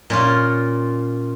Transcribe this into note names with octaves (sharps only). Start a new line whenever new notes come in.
A#2 C#4 F4